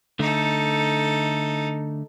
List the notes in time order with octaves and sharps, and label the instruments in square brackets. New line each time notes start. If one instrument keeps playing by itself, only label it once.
[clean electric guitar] D3 A3 [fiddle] D#4 A4